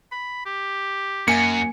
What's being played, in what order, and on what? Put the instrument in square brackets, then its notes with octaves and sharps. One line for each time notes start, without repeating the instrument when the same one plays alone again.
[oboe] B5
G4
[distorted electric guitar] F#2 [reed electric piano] A#3 G#5 [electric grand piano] C#7